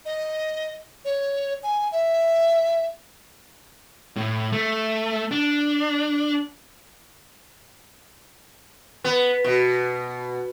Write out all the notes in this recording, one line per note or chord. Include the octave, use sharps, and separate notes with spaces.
D#5
C#5
G#5
E5
A2
A3
D4
B3
B2